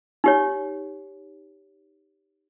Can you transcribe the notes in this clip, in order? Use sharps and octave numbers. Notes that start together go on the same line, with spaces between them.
D#4 G4 C#5